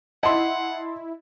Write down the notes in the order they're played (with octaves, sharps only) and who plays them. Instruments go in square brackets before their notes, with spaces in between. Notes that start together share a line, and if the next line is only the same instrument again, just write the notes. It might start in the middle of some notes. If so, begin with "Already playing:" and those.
[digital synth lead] E4 [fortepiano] D#5 [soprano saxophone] F#5 [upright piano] A5 C6